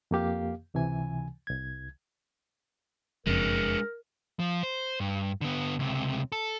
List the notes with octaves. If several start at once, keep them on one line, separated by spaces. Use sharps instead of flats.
F2 A#3 G4 F5
C#2 C3 E3 G#5
C2 G#6
F#1 F2 G#3 D4 A#4
F3
C5
G2
D3 B3
C#2 C3
A4